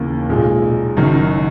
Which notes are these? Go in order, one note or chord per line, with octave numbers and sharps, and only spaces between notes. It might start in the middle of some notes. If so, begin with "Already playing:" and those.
Already playing: D#2 C#3 E3 A#3
B1 A#2 G#3
F#1 F#2 D#3